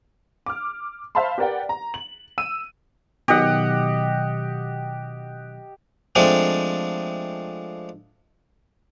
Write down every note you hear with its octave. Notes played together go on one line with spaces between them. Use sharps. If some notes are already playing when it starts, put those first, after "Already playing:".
D6 F6
C5 E5 F5 A5 B5 C6
G4 A#4 B4 D5 F#5 G5
A#5
F#7
E6 D#7
B2 D#3 F#3 G4 D#5 F#5
F3 G#3 A3 C4 D4